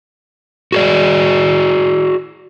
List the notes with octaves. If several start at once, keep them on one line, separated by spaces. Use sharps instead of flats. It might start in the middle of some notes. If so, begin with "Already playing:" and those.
F#4 G#4 D5